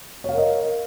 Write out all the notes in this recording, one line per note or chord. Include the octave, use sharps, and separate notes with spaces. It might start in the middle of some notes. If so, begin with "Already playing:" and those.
A#4 C#5 D#5 F5